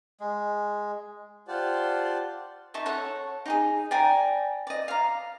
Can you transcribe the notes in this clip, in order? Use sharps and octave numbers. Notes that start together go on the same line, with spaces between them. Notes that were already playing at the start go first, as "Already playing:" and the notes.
G#3
F4 G4 C5 D5 F#5 A5
D#4 E5 A5 C#6
A4 C#5 F#5
D#4 G4 G#4
D5 G5 G#5 A#5
D5 D#5
F5 A#5